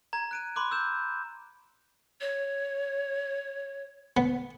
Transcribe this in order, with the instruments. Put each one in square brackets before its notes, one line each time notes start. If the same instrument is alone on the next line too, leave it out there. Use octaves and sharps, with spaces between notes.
[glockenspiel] A#5 G#6
F#6 D7 D#7
B5 C6 D6 F#6
E6 G6 E7
[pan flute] C#5
[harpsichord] B3